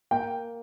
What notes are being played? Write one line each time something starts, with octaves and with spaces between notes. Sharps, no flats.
A#3 G5